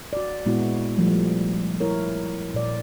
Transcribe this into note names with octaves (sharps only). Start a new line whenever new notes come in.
F#4 D5
A#2 G#3 B3 E4 F#4
F3 G3 A3
E4 A#4 C#5
A#2 D5